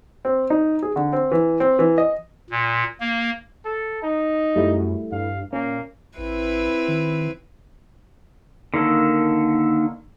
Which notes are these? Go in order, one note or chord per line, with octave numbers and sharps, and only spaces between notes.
C4
D#4
G#4
D3
C4
E3
C4
E3
D#5
A#2
A#3
A4
D#4
F#2 G3 A3 E4
G2 F5
A#2 A#3 C#4
A1 C4 E4 B4
D#3
D3 D#3 A#3 A4